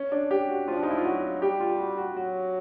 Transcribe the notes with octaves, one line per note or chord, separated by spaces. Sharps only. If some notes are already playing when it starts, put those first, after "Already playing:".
Already playing: C#4
D4
G4
F#4
F3 F4
D4
D#4
E4
F4
F#3 F#4
G3 G4
F4
F#4
F#4
F#3 F#4